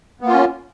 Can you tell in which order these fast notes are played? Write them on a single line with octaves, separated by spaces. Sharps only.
B3 A#3 F4 C#4